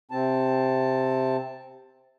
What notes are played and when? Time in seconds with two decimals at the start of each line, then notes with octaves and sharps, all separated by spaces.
0.11 C3 C4 A5